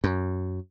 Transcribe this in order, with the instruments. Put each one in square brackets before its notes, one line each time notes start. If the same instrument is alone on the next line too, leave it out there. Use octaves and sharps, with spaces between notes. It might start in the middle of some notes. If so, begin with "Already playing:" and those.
[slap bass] F#2